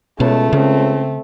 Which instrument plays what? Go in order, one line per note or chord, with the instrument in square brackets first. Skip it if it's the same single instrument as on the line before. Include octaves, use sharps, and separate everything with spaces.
[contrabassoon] C#2 [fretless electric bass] B2 [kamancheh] A3 [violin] C#5 A5
[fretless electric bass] C#3 [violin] C4